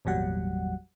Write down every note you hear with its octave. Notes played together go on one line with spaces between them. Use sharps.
G#1 E2 A#2 F#3 G3 F#5